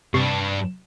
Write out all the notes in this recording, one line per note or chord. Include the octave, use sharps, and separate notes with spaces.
G2 C3 D4 C#6 C7